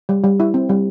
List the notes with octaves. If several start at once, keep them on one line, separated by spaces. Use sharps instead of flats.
G3
G3
E4
C4
G3